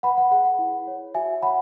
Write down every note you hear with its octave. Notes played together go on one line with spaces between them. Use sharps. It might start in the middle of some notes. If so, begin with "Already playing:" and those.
B4 F#5 B5
F#5
G#4 F#5
F#5
E4
C#5
F#4 E5 G#5
C#5 F#5 B5